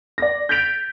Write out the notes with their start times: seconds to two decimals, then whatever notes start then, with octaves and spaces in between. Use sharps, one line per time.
0.18 D5 A#6
0.49 G6 A6 B6 D7 F7